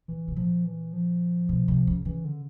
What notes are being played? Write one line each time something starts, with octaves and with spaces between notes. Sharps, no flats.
A#2 E3
B2
A#2 F3
E3
F3
B2
C3
C#3
C#3 E3
D3